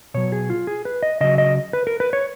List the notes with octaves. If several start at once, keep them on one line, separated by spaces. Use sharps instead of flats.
B2 F#3 C#5
G#4
F4
G#4
B4
D#5
C#3 F#3 D#5
D#5
B4
A#4
B4
C#5